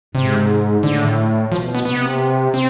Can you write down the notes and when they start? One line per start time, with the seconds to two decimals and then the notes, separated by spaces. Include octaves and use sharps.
0.15 G#2 C3
0.83 A2 D3
1.51 B2 F3
1.75 B3
1.85 C3 B3
2.54 C4